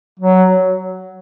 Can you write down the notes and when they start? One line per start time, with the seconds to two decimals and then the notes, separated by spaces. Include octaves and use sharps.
0.20 F#3